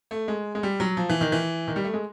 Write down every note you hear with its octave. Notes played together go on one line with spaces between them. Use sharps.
A3
G#3
G#3
G3
F#3
F3
E3
D#3
E3
D#3
G3
A3
G#3